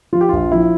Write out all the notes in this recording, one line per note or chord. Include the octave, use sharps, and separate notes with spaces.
F3 F4
G4
A#1 F4
F3 E4